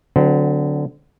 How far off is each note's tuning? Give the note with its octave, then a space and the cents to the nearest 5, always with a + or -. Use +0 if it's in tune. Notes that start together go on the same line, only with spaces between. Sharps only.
D3 -5 F#3 +0 C4 -40